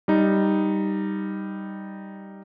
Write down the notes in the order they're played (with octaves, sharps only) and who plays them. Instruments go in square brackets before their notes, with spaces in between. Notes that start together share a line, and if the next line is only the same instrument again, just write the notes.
[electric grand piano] G3 D#4